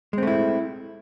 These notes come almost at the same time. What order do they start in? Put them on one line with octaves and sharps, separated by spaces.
G#3 C4 A3 E4